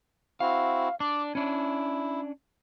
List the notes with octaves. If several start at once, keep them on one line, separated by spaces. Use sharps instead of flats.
C4 E4 F#4 F5
D4 D5 D6
C#4 D4 E4